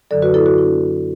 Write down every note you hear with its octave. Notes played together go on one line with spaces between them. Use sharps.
F#2 D3 F#3 A4 D5
F#4 B4
E4 A4
F#4
D3 B3 D4 E4